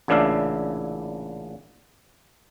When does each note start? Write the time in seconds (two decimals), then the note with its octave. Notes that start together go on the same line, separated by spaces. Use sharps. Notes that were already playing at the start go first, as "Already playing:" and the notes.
0.08 A1 A#2 C#3 D4 E4 F5